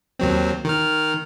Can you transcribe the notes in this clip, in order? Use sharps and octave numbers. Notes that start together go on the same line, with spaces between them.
D#2 F#3 C4
D#3 F6